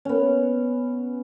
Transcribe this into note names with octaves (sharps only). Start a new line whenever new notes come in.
B3 C#4